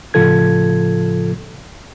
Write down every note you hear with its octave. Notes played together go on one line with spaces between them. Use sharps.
A2 C#3 F3 F4 A4 G#6